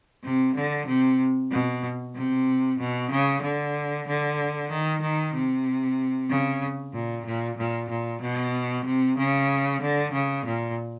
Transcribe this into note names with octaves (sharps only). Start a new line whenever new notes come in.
C3
D3
C3
B2
C3
B2
C#3
D3
D3
D#3
D#3
C3
C#3
A#2
A#2
A#2
A#2
B2
C3
C#3
D3
C#3
A#2